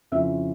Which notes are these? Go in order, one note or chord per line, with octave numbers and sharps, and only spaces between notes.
F2 C#3 F3 C#4 E4 E5